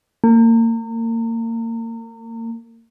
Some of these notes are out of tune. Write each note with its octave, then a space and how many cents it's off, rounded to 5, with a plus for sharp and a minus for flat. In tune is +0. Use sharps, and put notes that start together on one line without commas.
A#3 -35